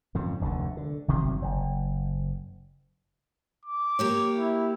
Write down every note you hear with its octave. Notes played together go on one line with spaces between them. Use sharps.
F2 G#2 C#3
F1 D2 A#2 D3
D3
G1 C3 D#3 F#3
F#1
D6
A#3 G4 C#5
E4